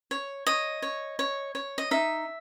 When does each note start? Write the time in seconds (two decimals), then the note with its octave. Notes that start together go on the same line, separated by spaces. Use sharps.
0.11 C#5
0.47 C#5 D#5
0.82 C#5
1.19 C#5
1.55 C#5
1.78 D#5
1.91 D#4 E5